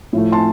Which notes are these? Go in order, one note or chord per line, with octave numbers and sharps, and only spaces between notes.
A2 F3 A3
A5 C6